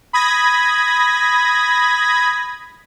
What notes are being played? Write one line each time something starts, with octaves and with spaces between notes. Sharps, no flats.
B5 D#6 G#6 A#6